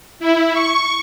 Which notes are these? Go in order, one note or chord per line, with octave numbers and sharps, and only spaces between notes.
E4
C#6